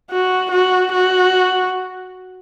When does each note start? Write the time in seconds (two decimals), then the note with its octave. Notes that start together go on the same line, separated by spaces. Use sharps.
0.11 F#4
0.51 F#4
0.92 F#4